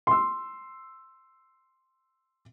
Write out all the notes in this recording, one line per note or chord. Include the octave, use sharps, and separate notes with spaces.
C6 E6